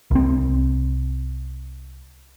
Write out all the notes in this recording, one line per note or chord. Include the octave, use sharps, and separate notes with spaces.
C2 C4